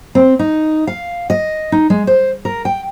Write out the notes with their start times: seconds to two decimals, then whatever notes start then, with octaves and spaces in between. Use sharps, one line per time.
0.15 C4
0.39 D#4
0.87 F5
1.30 D#5
1.72 D#4
1.90 G#3
2.07 C5
2.45 A#4
2.65 G5